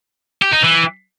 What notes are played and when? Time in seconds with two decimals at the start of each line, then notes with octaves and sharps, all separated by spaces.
0.42 G4
0.52 D#4
0.63 E3